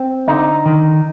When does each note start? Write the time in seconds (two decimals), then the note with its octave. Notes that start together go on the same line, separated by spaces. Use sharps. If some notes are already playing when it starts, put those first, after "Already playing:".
Already playing: C4
0.28 D3 D#4
0.66 D#3